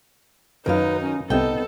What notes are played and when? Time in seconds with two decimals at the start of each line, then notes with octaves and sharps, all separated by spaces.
0.66 F#2 D#3 F#3 D#4 A#4 B4 F5
1.01 C#4
1.30 C2 C3 B3 D#4 A4 G5